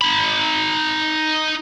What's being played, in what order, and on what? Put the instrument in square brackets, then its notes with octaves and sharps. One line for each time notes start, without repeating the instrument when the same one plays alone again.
[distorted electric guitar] D#4 B5